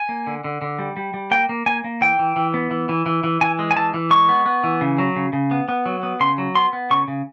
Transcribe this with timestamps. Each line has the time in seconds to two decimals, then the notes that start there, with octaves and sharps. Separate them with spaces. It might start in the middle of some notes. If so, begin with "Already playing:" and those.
Already playing: G#5
0.09 A#3
0.27 D3
0.44 D3
0.62 D3
0.79 G3
0.97 G3
1.14 G3
1.31 A#3 G5
1.49 A#3
1.66 A#3 G#5
1.84 A#3
2.01 E3 G5
2.19 E3
2.36 E3
2.54 B3
2.71 E3
2.89 E3
3.06 E3
3.24 E3
3.41 E3 G#5
3.59 G#3
3.71 G#5
3.76 E3 A5
3.94 E3
4.11 G#3 C#6
4.29 B3
4.46 B3
4.64 E3
4.81 C#3
4.98 F#3
5.16 C#3
5.33 C#3
5.51 B3
5.68 B3
5.86 F#3
6.03 B3
6.20 C#3 C6
6.38 F#3
6.55 B3 C6
6.73 B3
6.90 C#3 C#6
7.08 C#3